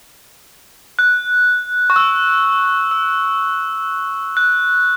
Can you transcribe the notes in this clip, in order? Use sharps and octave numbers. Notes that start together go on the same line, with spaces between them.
F#6
C#6
E6
E6
F#6